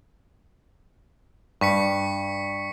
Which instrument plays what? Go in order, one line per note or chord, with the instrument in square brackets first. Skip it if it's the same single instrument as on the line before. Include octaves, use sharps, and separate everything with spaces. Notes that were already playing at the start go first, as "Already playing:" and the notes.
[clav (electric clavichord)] G2 [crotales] C#6 B6 C#7